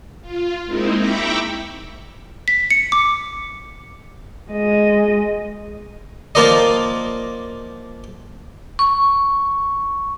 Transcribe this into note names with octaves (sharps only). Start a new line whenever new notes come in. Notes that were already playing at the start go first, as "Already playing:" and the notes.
F4
G#3 A#3 C4 D#4 E4
E5 G5 A#5 B5 C#6 D6
B6
C#7
D6
G#3 D#5
F3 A#3 F4 A#4 D5 D#5
C#6